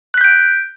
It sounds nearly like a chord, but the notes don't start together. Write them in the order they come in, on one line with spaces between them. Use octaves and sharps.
F#6 B6 G6 D7